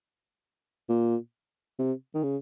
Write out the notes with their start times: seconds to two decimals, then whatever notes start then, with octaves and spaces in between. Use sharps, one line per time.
0.89 A#2
1.79 C3
2.14 D#3
2.23 C#3